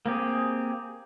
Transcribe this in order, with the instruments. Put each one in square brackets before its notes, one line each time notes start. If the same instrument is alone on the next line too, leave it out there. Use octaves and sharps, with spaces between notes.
[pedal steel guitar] A#3 C4 G4 G#4